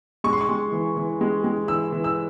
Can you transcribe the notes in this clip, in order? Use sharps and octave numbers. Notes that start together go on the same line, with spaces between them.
G#3 C#6
C6
C#6
G#3
E3
E3
G#3
G#3
E3 E6
E3
E6